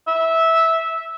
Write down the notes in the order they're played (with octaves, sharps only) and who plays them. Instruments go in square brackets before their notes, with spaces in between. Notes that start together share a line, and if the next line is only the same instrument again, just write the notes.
[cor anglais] E5